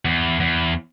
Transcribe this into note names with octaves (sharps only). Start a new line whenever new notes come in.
E2
E2